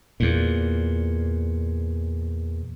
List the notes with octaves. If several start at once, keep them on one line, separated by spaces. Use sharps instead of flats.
E2 A#2